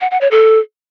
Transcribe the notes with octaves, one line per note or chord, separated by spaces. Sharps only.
F#5
F#5
C#5
A4